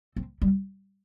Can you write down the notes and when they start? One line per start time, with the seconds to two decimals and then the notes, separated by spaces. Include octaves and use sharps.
0.16 C4
0.42 G3